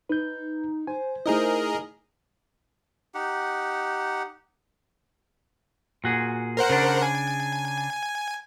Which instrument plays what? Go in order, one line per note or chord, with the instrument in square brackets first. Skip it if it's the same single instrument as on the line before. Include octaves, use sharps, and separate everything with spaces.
[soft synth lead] D#4 [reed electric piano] B4 G6
[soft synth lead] C5 [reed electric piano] G#5
[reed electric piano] A3 D#4 E4 [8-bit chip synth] G#4 A#4 D#5
[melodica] D#4 G4 F#5
[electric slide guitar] A#2 F#4 G#4
[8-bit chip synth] A#4 C5 F#5
[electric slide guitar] C#3 D4
[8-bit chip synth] G#5